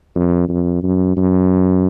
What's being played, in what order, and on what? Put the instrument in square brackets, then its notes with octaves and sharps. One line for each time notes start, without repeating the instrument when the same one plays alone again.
[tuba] F2
F2
F#2
F#2